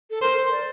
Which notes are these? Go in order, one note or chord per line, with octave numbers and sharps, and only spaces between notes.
A4
A#4 C5
C5
D5